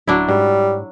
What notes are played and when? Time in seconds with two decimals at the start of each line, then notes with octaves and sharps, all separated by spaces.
0.08 D1 F#3 D4 E4
0.28 G#2 G3